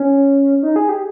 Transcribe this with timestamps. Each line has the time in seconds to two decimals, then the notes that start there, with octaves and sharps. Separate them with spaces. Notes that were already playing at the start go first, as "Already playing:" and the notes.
Already playing: C#4
0.63 D#4
0.76 G#4
0.89 G4